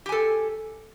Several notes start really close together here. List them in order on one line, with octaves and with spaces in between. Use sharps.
G4 G#5 A4